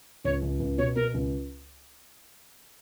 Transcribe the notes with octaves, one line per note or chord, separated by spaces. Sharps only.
C#2 C#5
C#2
C#2
B2 C#5
B2 A#4
C#2